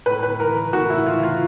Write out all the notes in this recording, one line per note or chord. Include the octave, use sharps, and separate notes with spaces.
A2 B4
B4
E3 A#4
A2 F#4
E4
E3 F4
F4